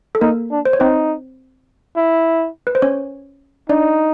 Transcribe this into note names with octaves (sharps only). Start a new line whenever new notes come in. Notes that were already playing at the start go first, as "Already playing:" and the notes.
A4
A#3 D#4 A#4
D4
C5
C#5
C4 D#4 C5
E4
B4
C5
C#4 C#5
D4 D#4 D5